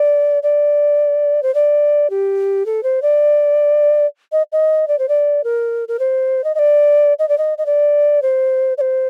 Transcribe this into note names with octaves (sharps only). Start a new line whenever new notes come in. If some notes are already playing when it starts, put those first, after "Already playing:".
Already playing: D5
D5
C5
D5
G4
A4
C5
D5
D#5
D#5
D5
C5
D5
A#4
A#4
C5
D#5
D#5
D5
D#5
D5
D#5
D#5
D5
C5
D5
C5